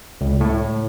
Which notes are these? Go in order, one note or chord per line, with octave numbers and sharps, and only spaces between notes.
C#2
A2